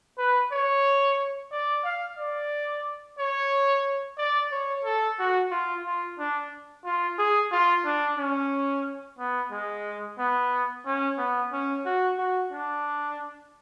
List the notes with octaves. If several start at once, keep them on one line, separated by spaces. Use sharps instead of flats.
B4
C#5
D5
F5
D5
C#5
D5
C#5
A4
F#4
F4
F4
D4
F4
G#4
F4
D4
C#4
B3
G#3
B3
C#4
B3
C#4
F#4
F#4
D4